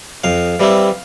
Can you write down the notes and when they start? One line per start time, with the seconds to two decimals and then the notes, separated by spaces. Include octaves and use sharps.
0.24 F2 F5
0.60 E3 G3 C4 E4